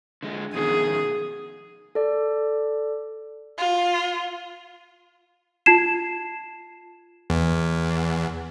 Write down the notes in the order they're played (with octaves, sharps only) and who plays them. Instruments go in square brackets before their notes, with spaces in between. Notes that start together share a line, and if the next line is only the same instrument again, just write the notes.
[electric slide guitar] D3 G#3
[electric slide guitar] F2 B2 D#3 [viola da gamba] G#4
[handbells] A4 D5
[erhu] F4
[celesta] F4 A5 G#6 C7 E7
[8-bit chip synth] E2